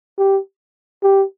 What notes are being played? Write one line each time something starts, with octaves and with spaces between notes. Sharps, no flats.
G4
G4